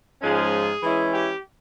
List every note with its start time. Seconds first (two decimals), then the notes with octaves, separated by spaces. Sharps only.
0.21 G#2 F3 G#3 C#4 F4 G#4
0.82 E3 G#3 C#4 E4
1.12 G4